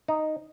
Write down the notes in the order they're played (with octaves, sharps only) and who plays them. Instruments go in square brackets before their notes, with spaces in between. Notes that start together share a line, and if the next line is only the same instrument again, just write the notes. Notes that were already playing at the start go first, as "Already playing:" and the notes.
[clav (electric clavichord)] D#4